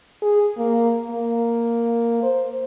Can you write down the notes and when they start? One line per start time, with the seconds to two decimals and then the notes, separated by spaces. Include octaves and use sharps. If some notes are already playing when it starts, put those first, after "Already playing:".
0.22 G#4
0.58 A#3
1.10 A#3
2.23 C5